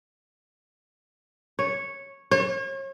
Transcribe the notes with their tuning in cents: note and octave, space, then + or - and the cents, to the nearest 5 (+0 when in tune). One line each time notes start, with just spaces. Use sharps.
C#5 -10
C#5 -40